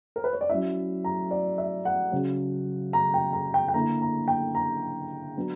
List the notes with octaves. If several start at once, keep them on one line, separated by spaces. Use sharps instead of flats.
A#4
B4
C#5
D5
F#3 C#4 E4 E5
A#5
D5
E5
F#5
C#3 F#3 C#4
A#5
G5
A#5
G5
G5
D3 A#3 E4 A#5
A#5
G5
A#5
F#3 B3 D4